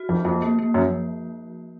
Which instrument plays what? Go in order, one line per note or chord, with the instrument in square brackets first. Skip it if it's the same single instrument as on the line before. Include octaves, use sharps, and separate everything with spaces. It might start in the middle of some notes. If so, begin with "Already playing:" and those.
Already playing: [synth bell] F#4
[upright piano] F2 [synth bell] F3
[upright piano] F2 [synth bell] A#3
[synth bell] A#3
A#3
[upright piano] F#2 [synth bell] F3